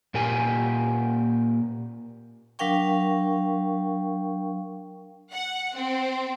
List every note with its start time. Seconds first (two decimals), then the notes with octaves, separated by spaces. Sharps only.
0.14 A#2 A#3 G4 G#5
2.59 F#3 D4 A#4 F5 G5 C#6
5.31 F#5
5.75 C4